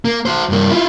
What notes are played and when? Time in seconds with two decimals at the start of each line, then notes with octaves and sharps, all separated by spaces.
0.05 A#3
0.26 F#4 C5
0.49 G2 A#3
0.70 E4 F4